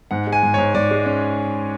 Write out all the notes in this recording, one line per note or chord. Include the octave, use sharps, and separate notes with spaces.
G#2 F#5
G#3
G#5
G#2
G#2 C#5
G#2 D5
G#3
C#4